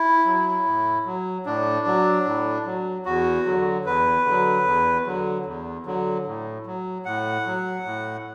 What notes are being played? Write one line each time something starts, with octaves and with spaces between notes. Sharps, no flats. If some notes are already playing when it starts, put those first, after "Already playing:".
Already playing: E4
F#3
A2
F#3
A2 D4
F#3
A2
F#3
E2 F#4
D3 F#3
E2 B4
D3 F#3
E2
D3 F#3
E2
D3 F#3
A2
F#3
A2 F#5
F#3
A2